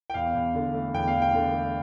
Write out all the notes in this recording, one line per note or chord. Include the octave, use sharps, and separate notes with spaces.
G5
E2 F5
E2
D3
A3
E2 G5
F5
E2
G5
D3
A3